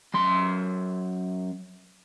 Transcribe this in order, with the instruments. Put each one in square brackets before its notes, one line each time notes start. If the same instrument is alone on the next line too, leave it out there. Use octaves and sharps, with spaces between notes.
[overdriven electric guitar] F#2 C6